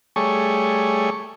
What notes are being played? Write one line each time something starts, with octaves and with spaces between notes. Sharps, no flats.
G3 A3 G#4 C#5 C#6